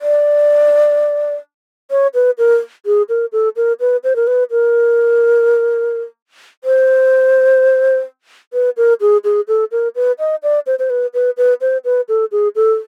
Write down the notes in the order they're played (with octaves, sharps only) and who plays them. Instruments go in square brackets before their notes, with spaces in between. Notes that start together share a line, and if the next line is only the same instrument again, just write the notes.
[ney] D5
C#5
B4
A#4
G#4
A#4
A4
A#4
B4
C5
A#4
B4
A#4
C5
B4
A#4
G#4
G#4
A4
A#4
B4
D#5
D5
C5
C5
B4
B4
B4
C5
B4
A4
G#4
A4